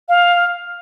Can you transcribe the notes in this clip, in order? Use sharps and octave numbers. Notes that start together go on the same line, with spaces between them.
F5